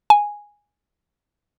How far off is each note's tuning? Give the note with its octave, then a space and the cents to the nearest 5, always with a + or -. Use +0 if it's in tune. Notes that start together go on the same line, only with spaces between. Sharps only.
G#5 -5